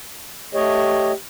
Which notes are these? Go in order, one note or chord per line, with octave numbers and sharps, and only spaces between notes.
A3 G4 C#5 D#5